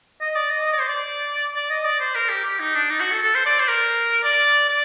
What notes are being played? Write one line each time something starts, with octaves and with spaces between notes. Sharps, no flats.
D#5
D5
D#5
D#5
D5
C5
D5
D5
D#5
D5
C5
A#4
G4
G4
D#4
D4
D#4
F#4
A4
A4
C5
D5
C5
A#4
D5
D5